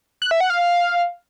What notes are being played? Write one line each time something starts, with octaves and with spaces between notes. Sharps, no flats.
F#6
E5
F#5
F5